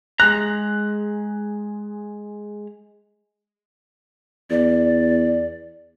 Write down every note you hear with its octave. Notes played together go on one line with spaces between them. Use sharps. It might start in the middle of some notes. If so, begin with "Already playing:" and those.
G#3 G#4 A#5 F#6
E2 D5